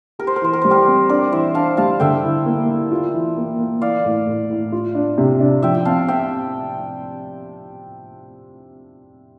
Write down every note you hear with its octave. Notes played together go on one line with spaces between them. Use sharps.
G4 A#4
C5
A#4
E3 C5
A#4
G3 C5
G4 A#4
C4
D4 A#4 D5
E3 C5 E5
D4 F5 A5
G3 F5 A5
D3 E5 G5
E4
A#3
E4
F4
E3
A#3
A#3
E3 D5 F5
A2
A2
A2
F4
D4
C3
D4
F3 E5 G5
G5
C4 F5 A5
C4 E5 G5